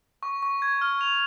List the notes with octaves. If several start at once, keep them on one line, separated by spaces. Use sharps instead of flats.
C#6
C#6
G#6
F6
F7